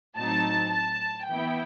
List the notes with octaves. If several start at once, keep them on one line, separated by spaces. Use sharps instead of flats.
A2 F#3 C4 D#4 A5
A5
E3 B3 E4 G5